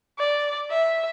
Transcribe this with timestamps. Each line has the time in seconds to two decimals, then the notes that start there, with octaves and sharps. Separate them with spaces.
0.19 D5
0.71 E5